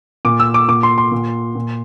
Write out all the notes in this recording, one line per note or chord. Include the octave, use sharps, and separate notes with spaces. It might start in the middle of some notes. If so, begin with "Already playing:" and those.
A#2 D6
E6
D6
A#2 D6
C6
C6
A#2
A#2